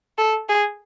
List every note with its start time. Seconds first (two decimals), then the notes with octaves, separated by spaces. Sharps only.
0.18 A4
0.49 G#4